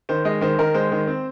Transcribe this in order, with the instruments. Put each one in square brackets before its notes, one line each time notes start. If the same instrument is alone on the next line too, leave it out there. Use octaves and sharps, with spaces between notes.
[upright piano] D#3 C5
G#3 D#5
D#3 C5
D#3 A#4
G#3 C5
D#3
C4